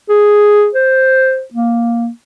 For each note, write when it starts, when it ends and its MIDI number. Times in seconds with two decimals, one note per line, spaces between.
0.09 0.70 68
0.74 1.43 72
1.53 2.08 58